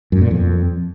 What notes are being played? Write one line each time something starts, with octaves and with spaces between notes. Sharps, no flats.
F#2
A#2
F2